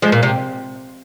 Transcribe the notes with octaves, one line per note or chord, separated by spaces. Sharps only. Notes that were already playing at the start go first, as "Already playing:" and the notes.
F3 G#3
A#2
C3